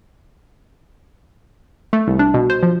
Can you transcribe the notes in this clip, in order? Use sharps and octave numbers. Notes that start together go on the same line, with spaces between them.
A3
C2
D4
B2
C5
F3